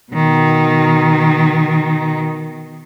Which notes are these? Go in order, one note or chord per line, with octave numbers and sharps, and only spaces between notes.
B2 D#3